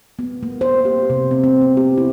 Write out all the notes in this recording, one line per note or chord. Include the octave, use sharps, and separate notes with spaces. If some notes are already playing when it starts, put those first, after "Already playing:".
B3
A#3
C5
G4
C3
C4
C4
B3
G4
E4